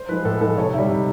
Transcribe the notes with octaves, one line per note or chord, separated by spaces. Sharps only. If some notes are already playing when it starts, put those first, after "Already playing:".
Already playing: C5
F3 G#3 B4
A2 A4
F3 G#3 A4
C3 C#5
D#3 G3 E5
C3